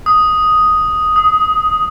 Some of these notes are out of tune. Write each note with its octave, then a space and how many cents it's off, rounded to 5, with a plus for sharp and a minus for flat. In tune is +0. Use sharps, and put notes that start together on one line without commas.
D#6 +5
D#6 +20